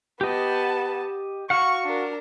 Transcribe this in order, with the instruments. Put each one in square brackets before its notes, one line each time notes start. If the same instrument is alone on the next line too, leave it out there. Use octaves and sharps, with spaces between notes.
[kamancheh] B3 A5 [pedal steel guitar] G4 D#5
[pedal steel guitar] F#4 F5 F#5 [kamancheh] C#6
[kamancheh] D4 A#4